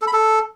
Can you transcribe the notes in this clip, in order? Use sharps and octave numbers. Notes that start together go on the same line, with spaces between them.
A4
B5
A4